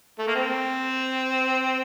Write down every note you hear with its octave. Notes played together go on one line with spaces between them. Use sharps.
A3
A#3
C4